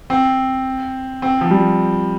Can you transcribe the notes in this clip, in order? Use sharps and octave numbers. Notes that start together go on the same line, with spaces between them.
C4
C4
F3
G3